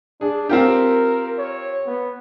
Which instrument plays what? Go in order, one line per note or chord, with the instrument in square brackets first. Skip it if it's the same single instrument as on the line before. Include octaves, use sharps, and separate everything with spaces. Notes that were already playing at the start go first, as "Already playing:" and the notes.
[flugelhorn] D4 [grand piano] G#4
[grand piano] C4 F4 G4 [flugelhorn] A#4
[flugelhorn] C#5
B3